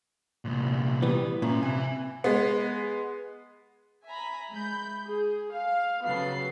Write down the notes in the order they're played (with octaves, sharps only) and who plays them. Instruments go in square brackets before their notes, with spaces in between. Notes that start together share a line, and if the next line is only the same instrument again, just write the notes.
[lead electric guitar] C2 A#2
[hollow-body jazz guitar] E3 G3 B3
[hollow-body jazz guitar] A#2 [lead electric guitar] C#4 E5
[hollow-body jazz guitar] C3 [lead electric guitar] E5 G#5
[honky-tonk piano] G#3 B3
[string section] E5 G#5 A#5 B5
G#3 B5 G6
G#4
F5
C#3 F3 F#3 B3 A4 C7